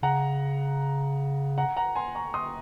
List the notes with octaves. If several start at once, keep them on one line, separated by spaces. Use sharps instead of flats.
C#3 F#5 A#5
F#5 A#5
F#5 A#5
G#5 C6
A#5 C#6
C6 D#6